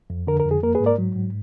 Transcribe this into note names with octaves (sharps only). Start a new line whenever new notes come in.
F2
D3 A#4
A#4
F2
G#4
A#3 A#4
G#4 B4
G#2
A#4 D5
F#3
G#2